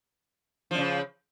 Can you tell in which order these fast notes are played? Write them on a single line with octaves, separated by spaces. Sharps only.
F3 F#2 C#3